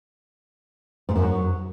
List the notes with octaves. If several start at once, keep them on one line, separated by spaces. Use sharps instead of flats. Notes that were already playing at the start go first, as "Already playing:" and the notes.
G#2
F#2
F#3